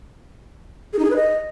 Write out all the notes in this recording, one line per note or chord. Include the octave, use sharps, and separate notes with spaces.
G#4
D#4
G#4
B4
D#5